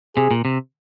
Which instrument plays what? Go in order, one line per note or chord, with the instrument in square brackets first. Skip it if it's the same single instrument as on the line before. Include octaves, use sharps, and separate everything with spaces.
[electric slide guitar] C3 [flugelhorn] G#4
[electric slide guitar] A#2
C3